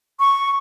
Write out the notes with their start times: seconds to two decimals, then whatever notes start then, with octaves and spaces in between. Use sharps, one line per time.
0.20 C#6